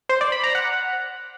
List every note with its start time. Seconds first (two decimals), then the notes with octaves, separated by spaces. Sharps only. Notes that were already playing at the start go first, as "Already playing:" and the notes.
0.09 C5
0.21 D5
0.32 B5
0.44 A#5
0.55 F#5